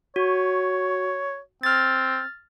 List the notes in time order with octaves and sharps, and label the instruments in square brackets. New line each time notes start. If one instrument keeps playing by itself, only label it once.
[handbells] F#4 [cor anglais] C#5
[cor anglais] C4 [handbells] F6 A6